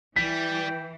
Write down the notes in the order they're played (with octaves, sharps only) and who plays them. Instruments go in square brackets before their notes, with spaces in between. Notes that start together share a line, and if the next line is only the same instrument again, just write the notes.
[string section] E3 [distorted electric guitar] G3 [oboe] G5 [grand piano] B6